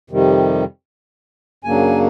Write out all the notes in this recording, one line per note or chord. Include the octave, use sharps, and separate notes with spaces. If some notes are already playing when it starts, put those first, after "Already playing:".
F2 C3 D#3 G3
F#2 C#3 F#3 A#3 D4 G#5